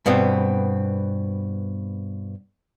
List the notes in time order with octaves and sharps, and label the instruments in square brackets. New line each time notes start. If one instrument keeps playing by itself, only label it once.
[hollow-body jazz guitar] G2 B2 B3 C4